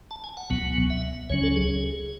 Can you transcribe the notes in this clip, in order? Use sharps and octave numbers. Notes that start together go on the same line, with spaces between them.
A5
G#5
F#5
C#2 B2 F#3 B3
E5
C#2 C#3 F#3 C#4 C#5
A4
G#4